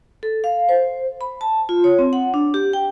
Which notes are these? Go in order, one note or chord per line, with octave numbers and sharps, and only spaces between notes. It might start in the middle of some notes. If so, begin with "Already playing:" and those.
A4
F5
C5
B5
A5
F4
C#5
C4
F#5
D4
G4
G5